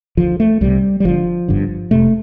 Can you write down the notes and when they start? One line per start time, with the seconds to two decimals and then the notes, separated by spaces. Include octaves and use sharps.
0.17 D2 D3 F3
0.40 A3
0.61 C2 C3 G3
1.00 G3
1.04 G1 G2 D3 F3
1.48 G1 G2 D3
1.91 F1 F2 C3 A3